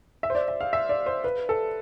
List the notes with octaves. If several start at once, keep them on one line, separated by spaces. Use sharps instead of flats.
E5
C5
D5
E5
F5
E5
D5
C5
B4
A4